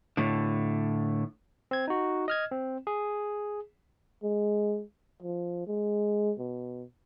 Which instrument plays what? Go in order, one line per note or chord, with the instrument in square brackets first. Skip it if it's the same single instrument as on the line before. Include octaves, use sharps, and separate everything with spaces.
[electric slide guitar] A2 D3
[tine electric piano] C4 G#6
D#4 F#4
D#5 F6 G#6
C4
G#4
[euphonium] G#3
F3
G#3
B2